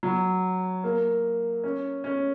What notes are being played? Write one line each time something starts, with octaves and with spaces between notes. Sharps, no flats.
F#3
A#3
C#4
C#4